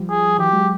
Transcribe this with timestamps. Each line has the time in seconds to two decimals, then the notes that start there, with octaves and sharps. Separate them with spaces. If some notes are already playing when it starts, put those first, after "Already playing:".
Already playing: F3 G3
0.10 G#4
0.38 E3 F#3 G4
0.53 F#3 G#3